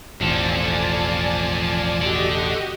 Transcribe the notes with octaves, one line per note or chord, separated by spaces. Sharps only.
E1 A1 F3 A4 D5 G#5 A5
F#4 G4 A4 D5 D#5